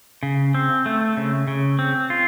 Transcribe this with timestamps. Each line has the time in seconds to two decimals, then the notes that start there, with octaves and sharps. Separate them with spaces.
0.23 C#3
0.54 C4
0.86 A3
1.17 C#3
1.48 C#3
1.79 C4
2.10 F4